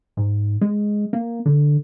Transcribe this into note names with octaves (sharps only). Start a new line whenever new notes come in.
G#2
G#3
A#3
D3